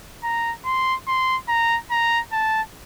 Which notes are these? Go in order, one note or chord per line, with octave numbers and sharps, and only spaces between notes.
A#5
C6
C6
A#5
A#5
A5